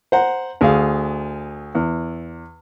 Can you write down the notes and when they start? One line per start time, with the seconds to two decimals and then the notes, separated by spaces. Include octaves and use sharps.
0.12 C5 F#5 A#5
0.61 D2 G#4 F5
1.75 E2